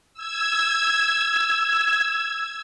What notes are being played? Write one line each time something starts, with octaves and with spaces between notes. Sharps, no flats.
E6 G#6